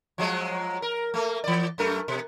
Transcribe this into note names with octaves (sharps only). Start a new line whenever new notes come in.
F3 F#3 G#3
A#4
A3 A#3
E3 D5
F#2 A3 A#4
B2